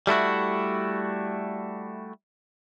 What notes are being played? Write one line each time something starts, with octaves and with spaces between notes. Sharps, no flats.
G3 A3 E4 F#4